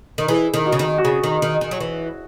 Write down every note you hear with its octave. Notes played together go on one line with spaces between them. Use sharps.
D#3
E3 G#4
D#3
F#4
C#3
D#3
F#4
C#3 G#4
D#3
D#3
D#3
F#3
E3